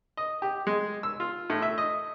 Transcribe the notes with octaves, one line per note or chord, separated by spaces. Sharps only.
D#5
G4
G#3
E6
F4
A2
E5
D#5